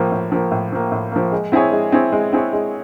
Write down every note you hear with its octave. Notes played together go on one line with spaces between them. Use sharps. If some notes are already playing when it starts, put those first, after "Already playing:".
Already playing: A2 F3 A#3
A2
F3 A#3
A2
F3 A#3
A2
F3 A#3
G#3
C4 E4 G#4 C#5
G#3
C4 E4 G#4 C#5
G#3
C4 E4 G#4 C#5
G#3